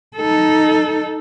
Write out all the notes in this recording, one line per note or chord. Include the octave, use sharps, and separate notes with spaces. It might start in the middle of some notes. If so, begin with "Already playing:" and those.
D#4 A4